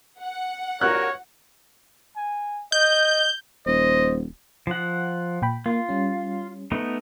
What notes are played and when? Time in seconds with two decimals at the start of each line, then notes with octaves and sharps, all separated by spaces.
0.19 F#5
0.81 G2 F#4 A#4 C#5 F#6
2.17 G#5
2.72 D#5 G6
3.67 D#1 C5 D#5
4.67 F3 F#5
5.42 A#2 G5 B5
5.66 A#3 F4
5.89 G3 C#4
6.72 A3 B3 D#4